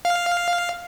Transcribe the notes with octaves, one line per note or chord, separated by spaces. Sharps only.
F5